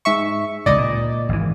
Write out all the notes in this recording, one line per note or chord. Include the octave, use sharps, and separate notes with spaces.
G#2 E5 C#6
C#2 A2 D5 D#5
A#2
G#1 E3